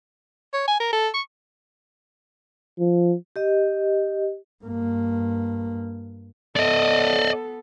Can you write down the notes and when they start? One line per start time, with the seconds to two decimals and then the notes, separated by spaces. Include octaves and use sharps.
0.53 C#5
0.67 G#5
0.80 A#4
0.93 A4
1.14 C#6
2.79 F3
3.36 G4 D#5
4.65 G2 A#3
6.56 B3 A4 D5 D#5